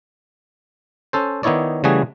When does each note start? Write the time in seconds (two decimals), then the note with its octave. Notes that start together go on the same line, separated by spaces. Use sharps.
1.13 C#4 A4 C5
1.43 D#3 B3 D#4 E4 C#5 D5
1.84 C#3 E3 G3 A3 F#4 G#4